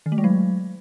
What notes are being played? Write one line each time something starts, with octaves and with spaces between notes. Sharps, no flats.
D#3
A3
G#3
F#3